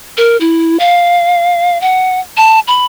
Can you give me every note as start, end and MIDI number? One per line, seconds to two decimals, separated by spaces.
0.17 0.37 70
0.41 0.77 64
0.80 1.80 77
1.81 2.20 78
2.37 2.60 81
2.68 2.86 83